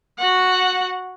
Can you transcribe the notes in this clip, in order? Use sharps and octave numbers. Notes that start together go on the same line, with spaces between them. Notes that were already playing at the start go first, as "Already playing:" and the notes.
F#4 F#5